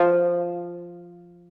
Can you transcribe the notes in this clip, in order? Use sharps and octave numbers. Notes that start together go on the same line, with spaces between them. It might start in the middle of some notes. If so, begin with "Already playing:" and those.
Already playing: F3